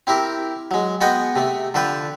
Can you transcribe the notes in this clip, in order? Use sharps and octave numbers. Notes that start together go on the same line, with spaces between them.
C4 E4 G4 A#4
F#3 G#3
G#3 B3 F#4 D#5 F#5 G5
C3 A3
D3 F3 A4 B4 G5